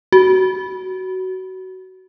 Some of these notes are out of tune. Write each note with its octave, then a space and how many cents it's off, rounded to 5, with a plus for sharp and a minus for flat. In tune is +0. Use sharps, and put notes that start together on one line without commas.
F#4 +15